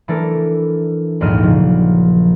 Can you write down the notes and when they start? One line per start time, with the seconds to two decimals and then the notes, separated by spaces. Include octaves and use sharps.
0.08 E3 A3 D4 A4 A#4
1.20 D#1 A#1 D#2 G#2 F6 D#7
1.42 C#3 F3 F#3